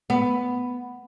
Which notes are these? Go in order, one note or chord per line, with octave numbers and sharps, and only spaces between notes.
B3